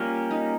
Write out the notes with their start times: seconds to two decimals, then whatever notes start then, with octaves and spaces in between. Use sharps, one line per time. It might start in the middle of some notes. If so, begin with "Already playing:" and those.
Already playing: G3 A#3 C#4 F4 G4
0.30 D#4